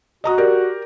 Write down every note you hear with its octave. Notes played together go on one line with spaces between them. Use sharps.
F#4 D#5 A#5 D#6
G4 A#4 D5